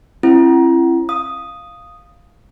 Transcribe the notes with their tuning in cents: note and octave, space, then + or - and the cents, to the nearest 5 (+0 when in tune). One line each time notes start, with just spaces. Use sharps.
C4 +45 E4 +35
F5 +0 D#6 +0